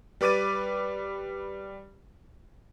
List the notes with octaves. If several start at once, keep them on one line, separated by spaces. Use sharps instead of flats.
G3 B4 D6 A6 D#7